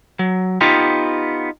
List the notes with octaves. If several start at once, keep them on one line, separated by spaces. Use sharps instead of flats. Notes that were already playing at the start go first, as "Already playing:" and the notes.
F#3
B3 D#4 F4 G4